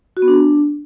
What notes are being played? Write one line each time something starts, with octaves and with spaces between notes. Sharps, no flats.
F#4
B3
D4